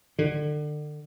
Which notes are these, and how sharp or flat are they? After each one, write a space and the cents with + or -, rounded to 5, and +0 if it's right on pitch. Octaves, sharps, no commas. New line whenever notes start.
D3 +30